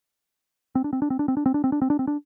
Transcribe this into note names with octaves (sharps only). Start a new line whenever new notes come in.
C4
D4
C4
D4
C4
D4
C4
D4
C4
D4
C4
D4
C4
D4
C4
D4